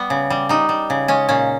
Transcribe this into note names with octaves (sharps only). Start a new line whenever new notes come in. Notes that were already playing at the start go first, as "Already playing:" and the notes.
Already playing: G3 B3
C#3
G3
G3 D#4
G3
C#3
G#3 C#4
A#2 C#4